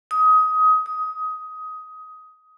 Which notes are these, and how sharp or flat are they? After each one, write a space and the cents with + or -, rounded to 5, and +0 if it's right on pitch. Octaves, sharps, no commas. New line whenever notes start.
D#6 +20
D#6 +15